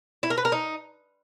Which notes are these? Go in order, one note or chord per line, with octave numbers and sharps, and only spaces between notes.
E4
A#4
B4
A#4
D#4